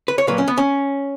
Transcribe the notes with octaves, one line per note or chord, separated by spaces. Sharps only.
B4
C#5
A#2 F#3 A#3 B4
C#4
B3
C#4